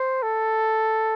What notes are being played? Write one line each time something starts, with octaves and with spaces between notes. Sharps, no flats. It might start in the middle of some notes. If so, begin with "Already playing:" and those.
Already playing: C5
A4